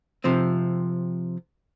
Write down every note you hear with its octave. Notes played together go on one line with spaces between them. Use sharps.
C3 F3 C4